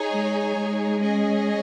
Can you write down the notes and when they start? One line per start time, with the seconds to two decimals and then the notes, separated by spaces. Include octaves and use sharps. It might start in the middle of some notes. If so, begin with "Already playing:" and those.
Already playing: D#4 G#4 C#5
0.10 G#3
0.55 G#3
1.00 C#4 G#4 D#5